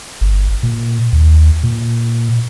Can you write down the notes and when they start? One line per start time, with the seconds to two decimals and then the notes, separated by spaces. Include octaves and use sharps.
0.21 G1
0.63 A#2
1.13 D#2
1.63 A#2